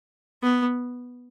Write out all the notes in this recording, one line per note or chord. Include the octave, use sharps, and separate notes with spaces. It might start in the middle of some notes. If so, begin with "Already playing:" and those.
B3